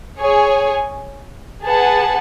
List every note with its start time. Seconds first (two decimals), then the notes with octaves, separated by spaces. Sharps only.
0.19 G#4 C#5 G#5
1.64 G#4 B4 F#5 A5